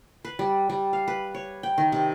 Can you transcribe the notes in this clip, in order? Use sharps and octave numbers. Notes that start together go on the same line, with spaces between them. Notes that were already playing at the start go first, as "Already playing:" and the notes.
B4
G3
G3
F5
B4
C#5
G5
D#3
C3